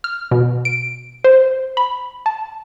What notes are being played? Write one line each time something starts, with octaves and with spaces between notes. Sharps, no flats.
F6
B2
D7
C5
B5
A5